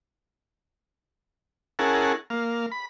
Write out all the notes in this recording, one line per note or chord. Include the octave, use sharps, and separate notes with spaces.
C#4 E4 G#4 A#4 F#5 A5
A#3 F5
B5